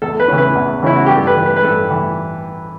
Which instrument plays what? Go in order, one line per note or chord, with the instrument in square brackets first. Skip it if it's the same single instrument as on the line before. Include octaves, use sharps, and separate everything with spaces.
[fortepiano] E2 A4
B4
C#3 E3
B4
E2
C#3 E3 E4
F#4
G2 G4
A4
B4
E3
B4
B4
G2 A4
E3